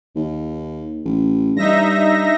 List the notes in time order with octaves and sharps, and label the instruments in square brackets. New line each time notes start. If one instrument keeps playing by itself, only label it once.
[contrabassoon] D#2
A1
[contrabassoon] G2 [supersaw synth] D#4 E5 A#6